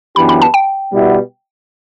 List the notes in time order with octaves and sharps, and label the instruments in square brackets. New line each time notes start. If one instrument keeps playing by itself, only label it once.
[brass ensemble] F#2 E3 B3 D4 G4 [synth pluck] B5
[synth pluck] B5
A5
G5
[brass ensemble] B2 G3 B3 E4